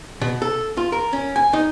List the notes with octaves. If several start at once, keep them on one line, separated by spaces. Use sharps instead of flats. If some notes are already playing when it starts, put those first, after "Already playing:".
B2
A4
F4
A#4
C#4
G#5
D#4